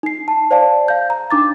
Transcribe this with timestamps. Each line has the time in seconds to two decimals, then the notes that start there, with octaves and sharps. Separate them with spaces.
0.03 D#4 C7
0.28 A5
0.51 C5 D5 F5 A5
0.88 F5 G6
1.10 A#5
1.31 D4 D#4 D6 A6